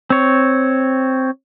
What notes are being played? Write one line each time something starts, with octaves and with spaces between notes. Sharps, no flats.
C4 C#5